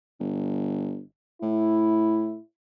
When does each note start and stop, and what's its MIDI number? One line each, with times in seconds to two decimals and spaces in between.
0.20 1.01 31
1.42 2.37 45
1.42 2.42 64